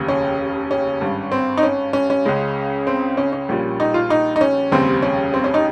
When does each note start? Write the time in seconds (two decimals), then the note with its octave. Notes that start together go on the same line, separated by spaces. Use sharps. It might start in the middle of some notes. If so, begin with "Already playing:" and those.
Already playing: F1 D#2 C#3
0.08 C#4
0.71 C#4
1.01 G#1 G2 G3
1.32 C4
1.57 D#4
1.63 C#4
1.93 C#4
2.10 C#4
2.25 C#2 C#3 G#3
2.87 C4
3.17 C#4
3.33 C#4
3.49 A#1 A#2 G3
3.80 D#4
3.94 F4
4.10 D#4
4.36 D#4
4.41 C#4
4.72 F1 D#2 C#3 G3 C4
5.02 C#4
5.34 C4
5.44 C#4
5.54 D#4